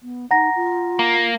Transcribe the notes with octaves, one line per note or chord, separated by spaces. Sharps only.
B3
D#4 F#5 A#5 A#6
F4
A#3